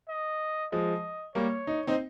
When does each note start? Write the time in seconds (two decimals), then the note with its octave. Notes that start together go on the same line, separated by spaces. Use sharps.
0.09 D#5
0.72 F3 G#3 D#5
1.35 G3 A#3 C#5
1.67 D#4
1.87 C4 D#4